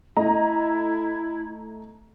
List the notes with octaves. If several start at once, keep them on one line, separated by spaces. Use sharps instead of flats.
A3 E4 D#5 A#5